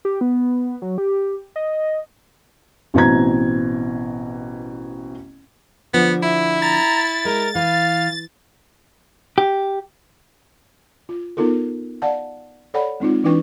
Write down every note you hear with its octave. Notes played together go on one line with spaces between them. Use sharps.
G4
B3
F#3
G4
D#5
A1 B2 E3 C4 A#5 G#6
D3 F3 B3
E4 E5
A#5 A6
G#3 A#4
E3 F5
G4
F4
B3 D#4 F4 A4 A#4
D5 F5 F#5 A5
A4 C#5 D5 F#5 G5 B5
G#3 C4 D#4 F4
E3 D4 E4 B4 G5 C#6